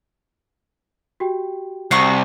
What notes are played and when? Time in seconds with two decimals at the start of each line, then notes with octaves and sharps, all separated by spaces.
1.20 F#4 G4 G5
1.91 C2 F5 F#5 C#6